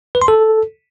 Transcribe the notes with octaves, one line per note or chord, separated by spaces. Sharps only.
B4
C6
A4